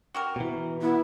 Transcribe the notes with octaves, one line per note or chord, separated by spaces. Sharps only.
F#4 G4 A#4
B2 E3
B3 E4